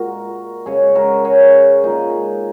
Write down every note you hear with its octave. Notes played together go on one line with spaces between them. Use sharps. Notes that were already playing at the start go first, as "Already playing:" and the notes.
Already playing: A#2 G#3 F#4 A#4
C#3 G#3 G#4 C#5
F#4 A#4
G#4 C#5
A#2 G#3 D#4 G#4